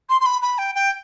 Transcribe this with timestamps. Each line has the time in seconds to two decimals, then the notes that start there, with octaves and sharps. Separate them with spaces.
0.09 C6
0.21 C6
0.25 B5
0.41 B5
0.58 G5
0.75 G5